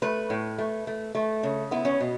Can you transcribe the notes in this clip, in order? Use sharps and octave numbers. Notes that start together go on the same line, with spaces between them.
A3 B4
A2
A3
A3
A3
C#3
B3 E4
C#4
B2